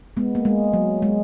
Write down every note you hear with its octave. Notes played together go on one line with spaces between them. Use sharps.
G#3 B3
A#3
G#3
F#3
G#3